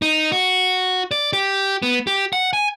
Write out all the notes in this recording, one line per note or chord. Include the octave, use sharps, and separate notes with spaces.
D#4
F#4
D5
G4
B3
G4
F#5
G#5